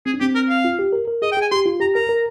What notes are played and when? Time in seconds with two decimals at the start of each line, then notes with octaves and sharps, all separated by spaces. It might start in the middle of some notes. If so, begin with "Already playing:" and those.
0.06 C4 G#4
0.14 D4
0.20 C4 G4
0.35 A#4
0.49 F5
0.65 F4
0.79 G4
0.93 A#4
1.08 A#4
1.22 G#4 D#5
1.32 G5
1.37 G#4 G#5
1.51 G4 C6
1.66 F4
1.80 G4 A#5
1.95 A#4 A#5
2.09 A#4